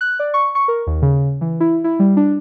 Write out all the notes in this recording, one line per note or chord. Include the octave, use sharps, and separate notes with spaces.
F#6
D5
C#6
C#6
A#4
D#2
C#3
E3
E4
E4
G3
D4